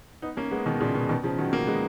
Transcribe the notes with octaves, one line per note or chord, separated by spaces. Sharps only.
B3 D#4
A#3 C#4
G#3 B3
B2 D#3
A#2 C#3
B2
B2 D#3
C#3 F3
D#3 F#3
F#3 A#3
G#3 B3